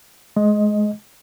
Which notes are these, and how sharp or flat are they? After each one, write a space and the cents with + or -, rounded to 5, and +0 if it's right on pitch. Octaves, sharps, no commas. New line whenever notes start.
G#3 +25 D#5 +5